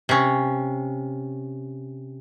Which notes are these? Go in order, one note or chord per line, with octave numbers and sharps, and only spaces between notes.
C3 C#4